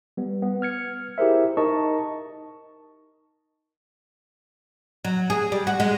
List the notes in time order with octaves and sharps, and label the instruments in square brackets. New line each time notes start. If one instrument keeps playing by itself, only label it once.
[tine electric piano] G3 B3
B3
F6 G#6 C#7
E4 G4 G#4 A#4 C5 E5
D#4 A#4 D#5 A5 C#6
[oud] F#3
G#4
G3
F#4
G#3